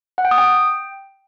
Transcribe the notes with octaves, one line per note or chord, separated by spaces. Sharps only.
F#5
G5
D#6
G5